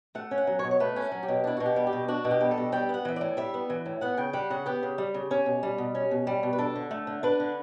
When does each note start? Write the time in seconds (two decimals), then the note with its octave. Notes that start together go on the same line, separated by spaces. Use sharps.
0.15 A3 F#5
0.31 C#4
0.38 F#5
0.47 F#3
0.59 C#5
0.64 B2
0.71 C#5
0.80 A3 B4
0.96 C#4
1.12 F#3
1.23 G4
1.28 B2
1.44 D4 E4
1.57 F#4
1.60 B2
1.66 G4
1.76 G3
1.87 G4
1.93 B2
2.08 D4 F#4
2.25 B2
2.31 G4
2.41 G3
2.51 A4
2.57 B2
2.72 G3 G5
2.89 B3 F#5
3.05 E3 E5
3.16 A2 D5
3.37 G3 E5
3.54 B3
3.70 E3
3.86 A2
4.01 B3 F#5
4.17 C#3 G5
4.33 G3 F#5
4.50 C#3 F#5
4.66 B3 G4
4.83 C#3
4.98 G3
5.14 C#3
5.31 C#4
5.46 B2
5.63 G3
5.78 B2
5.95 C#4
6.11 B2
6.27 G3
6.43 B2
6.53 B4
6.58 D4 A4
6.76 D3
6.91 A3
7.07 D3
7.23 D4 B4
7.40 D3